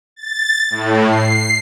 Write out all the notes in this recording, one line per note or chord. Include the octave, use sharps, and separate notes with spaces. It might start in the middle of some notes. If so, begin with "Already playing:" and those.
A6
A2
C7